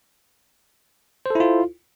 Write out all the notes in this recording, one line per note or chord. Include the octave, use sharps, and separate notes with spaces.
E4 F4 A4 C5